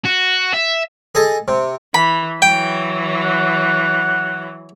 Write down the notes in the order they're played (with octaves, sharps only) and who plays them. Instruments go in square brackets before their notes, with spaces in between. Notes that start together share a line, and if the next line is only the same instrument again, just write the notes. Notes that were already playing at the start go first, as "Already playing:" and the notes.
[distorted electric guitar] F#4
E5
[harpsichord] G#4 A4 D#5 A5
C3
[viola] E3 [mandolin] B5
[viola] E3 F#3 [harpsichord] G5
[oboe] F#5